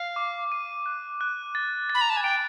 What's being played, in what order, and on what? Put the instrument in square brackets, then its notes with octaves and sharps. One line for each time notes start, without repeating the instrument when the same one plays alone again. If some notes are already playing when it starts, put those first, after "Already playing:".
Already playing: [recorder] F5
[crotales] D6
D#7
F#6
F#6
A6
A6
[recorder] B5
A#5
A5
G#5
[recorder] G5 [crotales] D7